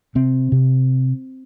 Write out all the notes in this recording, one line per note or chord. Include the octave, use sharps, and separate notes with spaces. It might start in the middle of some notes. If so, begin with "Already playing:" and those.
C3 C4
C3